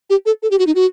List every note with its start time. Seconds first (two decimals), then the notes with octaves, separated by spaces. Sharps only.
0.10 G4
0.26 A4
0.43 A4
0.51 G4
0.59 F#4
0.67 D#4
0.75 F#4